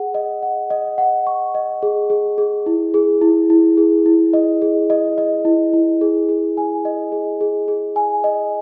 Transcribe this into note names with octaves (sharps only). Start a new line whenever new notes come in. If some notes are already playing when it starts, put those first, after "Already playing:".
Already playing: G#4 F#5
D#5
F#5
D#5
F#5
C#6
D#5
G#4
G#4
G#4
E4
G#4
E4
E4
G#4
E4
D#5
G#4
D#5
D#5
E4
E4
G#4
G#4
G#5
D#5
G#4
G#4
G#4
G#5
D#5